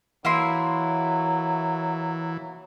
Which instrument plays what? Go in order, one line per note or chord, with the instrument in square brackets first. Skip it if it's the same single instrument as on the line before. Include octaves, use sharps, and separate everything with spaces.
[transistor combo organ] E3 [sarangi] F#3 [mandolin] A#3 E4 C6